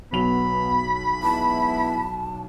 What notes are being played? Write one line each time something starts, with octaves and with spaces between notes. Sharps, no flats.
B1 F#3 B3 B5 F7
G#3 B3 E4 A5